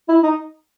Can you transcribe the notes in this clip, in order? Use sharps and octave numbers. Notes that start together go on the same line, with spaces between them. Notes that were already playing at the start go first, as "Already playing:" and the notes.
E4
D#4